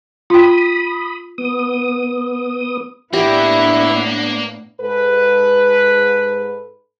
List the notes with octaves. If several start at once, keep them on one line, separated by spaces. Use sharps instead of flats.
F4 G5 B5 D#6
B3 D#6
A2 A#3 B3 D4 E4 G4
G#2 A4 B4